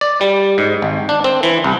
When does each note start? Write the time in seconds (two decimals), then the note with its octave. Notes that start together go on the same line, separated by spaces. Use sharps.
0.01 D5
0.21 G3
0.58 G#2
0.82 G#1
1.09 D4
1.24 C4
1.43 E3
1.64 C2